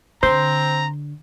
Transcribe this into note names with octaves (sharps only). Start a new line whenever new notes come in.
D3 C4 C5 A#5